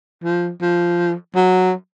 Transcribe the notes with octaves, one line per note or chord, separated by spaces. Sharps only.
F3
F3
F#3